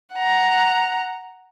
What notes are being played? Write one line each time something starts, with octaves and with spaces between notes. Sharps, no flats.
F#5 A#5